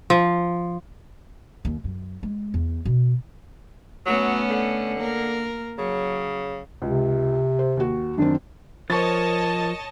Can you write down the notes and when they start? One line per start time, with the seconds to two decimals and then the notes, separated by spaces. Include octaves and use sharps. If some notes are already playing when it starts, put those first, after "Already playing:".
0.10 F3
1.65 D#2
1.84 F#2
2.23 G#3
2.54 E2
2.85 B2
4.06 F#3 A3 B3 C#4
4.50 D3
4.97 A#3 A#4
5.78 C#3 F#3
6.82 C#2 C3
7.59 C5
7.77 D#2 F#4
8.18 F#2 D#3 C4 D4
8.90 F3 A#4 C5 C#5 D#5 A5 C#6 A6